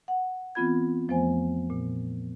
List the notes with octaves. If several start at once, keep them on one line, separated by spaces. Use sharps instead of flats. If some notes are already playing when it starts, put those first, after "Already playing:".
F#5
E3 B3 C4 F4 B5 G#6
F2 F3 A3 B3 C5 G#5
A#2